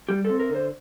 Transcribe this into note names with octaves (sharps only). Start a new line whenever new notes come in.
G3 G4
C4 A4
A#4
D3
C5